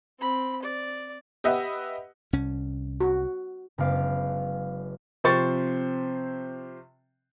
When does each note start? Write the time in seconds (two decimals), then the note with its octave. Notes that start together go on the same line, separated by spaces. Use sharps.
0.19 C4 B5
0.62 D5
1.44 G4 B4 D#5 E5 F#5
2.33 C2 C#4
3.00 F#4
3.78 F#1 G#3 B3 F5 D6
5.24 C3 F3 C4 C5 C#6 A6